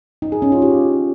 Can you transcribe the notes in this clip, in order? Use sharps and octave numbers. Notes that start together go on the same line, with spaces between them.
D#4
G#4
C#4
F4
G4